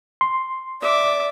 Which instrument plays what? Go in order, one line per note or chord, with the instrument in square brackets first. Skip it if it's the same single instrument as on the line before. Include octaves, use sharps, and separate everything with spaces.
[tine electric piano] C6
[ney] D5 [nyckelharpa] E5 D6